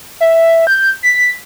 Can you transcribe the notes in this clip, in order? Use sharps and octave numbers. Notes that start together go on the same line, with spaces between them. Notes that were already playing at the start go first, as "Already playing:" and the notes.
E5
G6
B6